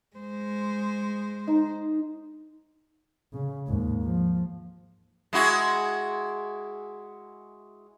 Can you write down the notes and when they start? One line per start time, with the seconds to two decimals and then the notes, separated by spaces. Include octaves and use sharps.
0.17 G#3 C5
1.48 D#4
3.33 C#3
3.67 D#2 G#2
4.03 F3
5.33 G#3 E4 F#4